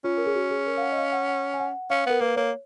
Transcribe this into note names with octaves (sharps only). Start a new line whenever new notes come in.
C#4 F4
A#4
G#4
F#4
G#4
A#4
F5
F#5
D#5
F5
F#5
F#5
G#5
F#5
C#4 F5
B3 A#4
A#3 B4
A#3 C#5